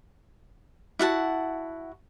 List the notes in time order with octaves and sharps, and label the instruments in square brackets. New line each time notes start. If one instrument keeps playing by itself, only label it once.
[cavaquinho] E4 F#4 F#5 A5